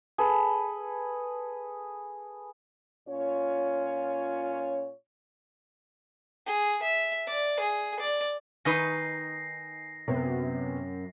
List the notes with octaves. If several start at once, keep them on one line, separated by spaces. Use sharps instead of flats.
G#4 A4 B4
A#2 C#4 F4 C#5
G#4
E5
D5
G#4
D5
D#3 D#4 B4 G#5 D#6 A#6 C7
F#2 C3 B3